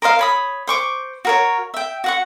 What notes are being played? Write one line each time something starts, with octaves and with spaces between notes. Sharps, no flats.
A#4 C5 D#5 F5
C#5 B5 D#6
C5 C#6 D6
F#4 A#4 C#5
E5 G5
F#4 F#5 C#6